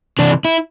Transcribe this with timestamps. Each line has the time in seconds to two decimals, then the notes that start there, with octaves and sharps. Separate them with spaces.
0.19 C3 E3 D4
0.45 E4